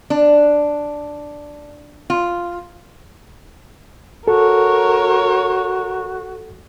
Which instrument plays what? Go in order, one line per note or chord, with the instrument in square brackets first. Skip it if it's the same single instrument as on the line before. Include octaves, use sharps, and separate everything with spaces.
[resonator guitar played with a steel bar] D4
F4
[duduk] F#4 [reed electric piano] A4 [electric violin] A#4 C#5